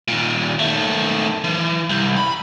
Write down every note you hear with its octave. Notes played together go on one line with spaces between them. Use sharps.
D#2 A#2
D#3 A3
E3
C2
B5